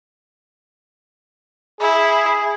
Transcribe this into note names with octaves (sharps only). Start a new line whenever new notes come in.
E4 G#4